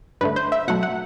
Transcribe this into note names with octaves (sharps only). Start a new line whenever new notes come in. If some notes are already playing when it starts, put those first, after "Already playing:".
G2 D3 A3 B4
C5
E5
B2 F#3 A3 F#5
F#5